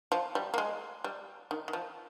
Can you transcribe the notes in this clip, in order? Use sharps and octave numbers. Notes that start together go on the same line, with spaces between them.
F3
G3
A#3
G#3
G3
D#3
D#3
F3